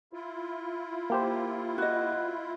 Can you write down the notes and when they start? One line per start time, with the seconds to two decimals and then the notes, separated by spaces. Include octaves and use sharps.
0.13 E4 F4
1.10 A#3 G4 C5
1.78 F#4 D#5